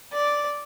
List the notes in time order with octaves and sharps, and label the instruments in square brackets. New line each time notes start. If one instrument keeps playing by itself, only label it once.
[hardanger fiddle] D5